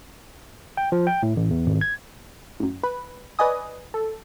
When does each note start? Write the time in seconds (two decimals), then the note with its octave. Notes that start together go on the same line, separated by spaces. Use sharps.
0.77 G5
0.92 F3
1.07 G5
1.23 A2
1.36 A1
1.50 E2
1.66 G#1
1.81 G#6
2.60 A1 F#2
2.83 B4
3.39 B4 D5 D#5 G#5 D#6
3.94 A4